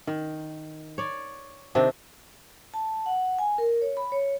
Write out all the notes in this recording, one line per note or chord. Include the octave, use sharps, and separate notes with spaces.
D#3
C#5 D5
C3 D#3 C4 D4
A5
F#5
G#5
A#4
C#5
B5
C#5